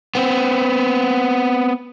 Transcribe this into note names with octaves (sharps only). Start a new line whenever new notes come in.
B3 C4